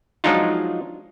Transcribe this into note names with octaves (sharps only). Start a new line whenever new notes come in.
F3 F#3 G#3 D4 D#4 F4